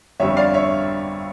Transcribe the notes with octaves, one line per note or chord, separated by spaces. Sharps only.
G1 F2 D3 G3 C#5 E5
D5 F5
C#5 E5